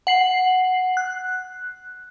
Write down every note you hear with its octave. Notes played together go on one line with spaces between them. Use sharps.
F#5 C7 F#7
F#6